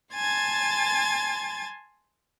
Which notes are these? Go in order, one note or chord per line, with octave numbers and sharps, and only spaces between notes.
G#5 A5 C6 G#6 A6